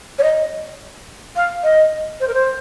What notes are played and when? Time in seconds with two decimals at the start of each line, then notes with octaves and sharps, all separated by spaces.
0.18 C#5
0.23 D#5
1.36 F5
1.63 D#5
2.20 C5
2.28 A#4
2.34 C5